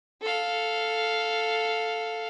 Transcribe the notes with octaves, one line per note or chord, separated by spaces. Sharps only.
A4 F5